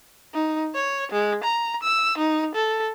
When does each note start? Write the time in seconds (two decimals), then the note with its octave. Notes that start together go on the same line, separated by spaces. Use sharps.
0.34 D#4
0.75 C#5
1.12 G#3
1.44 A#5
1.83 E6
2.18 D#4
2.55 A4